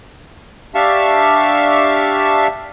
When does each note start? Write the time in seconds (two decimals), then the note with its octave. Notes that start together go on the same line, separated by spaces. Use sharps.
0.75 D4 G4 E5 F5 A5 C#6